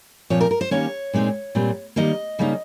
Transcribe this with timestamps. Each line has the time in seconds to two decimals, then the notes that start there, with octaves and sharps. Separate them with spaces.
0.30 A#2 F3 C4 C#5
0.41 A#4
0.51 A#4
0.61 C5
0.71 D#3 G3 A#3 C#4 C#5
1.13 A#2 G#3 C4 D#4
1.55 A#2 G3 C4
1.96 D#3 G3 A#3 D#5
2.39 C#3 G3 A#3 D#4